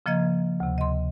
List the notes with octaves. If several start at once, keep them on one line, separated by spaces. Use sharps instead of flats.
C#3 F3 A#3 D#5 G#6
D2 C3
D#5 C6